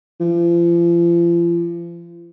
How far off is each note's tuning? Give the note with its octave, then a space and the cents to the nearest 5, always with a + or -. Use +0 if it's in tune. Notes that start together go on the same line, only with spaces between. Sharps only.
F3 -40